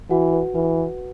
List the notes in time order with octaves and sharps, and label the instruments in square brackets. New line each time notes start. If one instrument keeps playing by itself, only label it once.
[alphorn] E3 [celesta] F#4 F#5
[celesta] B4
[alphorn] E3 [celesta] B4